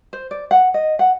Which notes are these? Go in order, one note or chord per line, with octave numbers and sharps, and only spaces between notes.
C5
D5
F#5
D#5
F#5